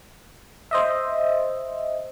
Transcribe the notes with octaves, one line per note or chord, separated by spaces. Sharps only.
C5 D#5 E5